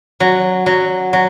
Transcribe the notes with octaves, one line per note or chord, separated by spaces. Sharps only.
F#3
F#3
F#3